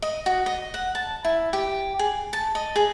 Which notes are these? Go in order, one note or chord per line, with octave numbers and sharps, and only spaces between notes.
D#5
F#4
D#5
F#5
A5
E4
G4
G#4
A5
D#5
G#4